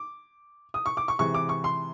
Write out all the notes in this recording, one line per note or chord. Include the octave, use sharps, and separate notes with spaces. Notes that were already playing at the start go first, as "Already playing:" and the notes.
Already playing: D6
D#6
C#6
D6
C#6
C3 E3 G#3 C#6
D6
C#6
C6